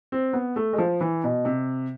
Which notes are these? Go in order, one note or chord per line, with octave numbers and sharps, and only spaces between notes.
C4
B3
A3
G#3
F3
E3
B2
C3